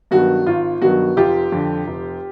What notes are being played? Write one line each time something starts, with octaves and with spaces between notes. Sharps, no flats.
G2 D#3 F#3 B3 F#4
G#1 F4
G2 D#3 F#3 B3 F#4
F1 F4 G4
F2 D3
F1